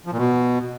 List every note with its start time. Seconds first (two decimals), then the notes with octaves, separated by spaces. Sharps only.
0.07 F3
0.12 A#2
0.18 B2